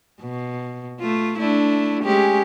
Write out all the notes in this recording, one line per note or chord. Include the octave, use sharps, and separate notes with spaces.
B2
A3 F4
A3 D4 E4
G#3 C#4 G4